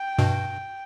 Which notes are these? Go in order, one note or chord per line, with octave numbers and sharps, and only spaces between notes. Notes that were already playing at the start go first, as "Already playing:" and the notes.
Already playing: G5
G2 B2